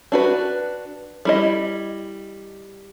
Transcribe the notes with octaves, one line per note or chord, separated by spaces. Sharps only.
D4 F#4 B4
G3 E4 D#5